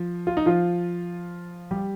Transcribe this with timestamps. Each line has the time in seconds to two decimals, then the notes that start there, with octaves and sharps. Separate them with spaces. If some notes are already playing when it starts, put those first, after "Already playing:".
Already playing: F3
0.27 F4
0.37 D#4
0.46 F3 F4
1.71 G3 G4